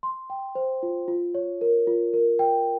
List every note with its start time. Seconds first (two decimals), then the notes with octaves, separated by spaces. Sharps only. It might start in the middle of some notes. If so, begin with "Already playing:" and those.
0.03 C6
0.30 G5
0.55 C5
0.83 F4
1.08 F4
1.35 C#5
1.61 A#4
1.87 F4
2.14 A#4
2.39 G5